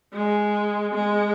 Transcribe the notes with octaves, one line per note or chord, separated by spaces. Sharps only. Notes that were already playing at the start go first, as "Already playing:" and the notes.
G#3
G#3